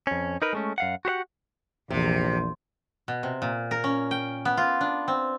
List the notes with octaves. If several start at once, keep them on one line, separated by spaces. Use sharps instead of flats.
F2 C#4
D#4 A#4 B4
G#3 A3 C#4
F#2 F5 F#5
F#4 G4 C5 F#5
A#1 E2 C3
B2
C3
A#2
A#4
C#4
G5
B3
F4
D4
C4